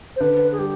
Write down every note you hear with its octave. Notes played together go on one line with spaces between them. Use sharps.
C5
D3 B4
G#4
G3 G4